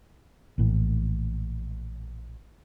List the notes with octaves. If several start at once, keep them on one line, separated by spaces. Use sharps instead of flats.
A#1 A2 E3